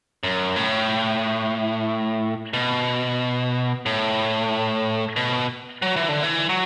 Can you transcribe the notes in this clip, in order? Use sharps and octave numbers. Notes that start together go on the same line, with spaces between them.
F#2
A2
B2
A2
B2
F#3
E3
D3
E3
F#3